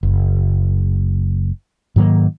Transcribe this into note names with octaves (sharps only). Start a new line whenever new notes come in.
F#1
G#2 D#3 F#3 A#3